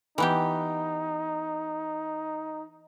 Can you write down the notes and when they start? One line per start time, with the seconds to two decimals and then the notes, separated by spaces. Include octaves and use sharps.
0.18 E3 B3 D#4 G4